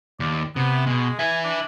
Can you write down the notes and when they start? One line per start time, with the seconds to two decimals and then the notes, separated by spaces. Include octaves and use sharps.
0.20 D#2 D5
0.56 C3 B3
0.87 B2 G#3
1.19 B4 E5 G#5
1.44 D4